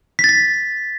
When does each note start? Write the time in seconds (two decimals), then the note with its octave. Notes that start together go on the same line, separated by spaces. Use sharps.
0.19 B6
0.24 A6
0.29 B6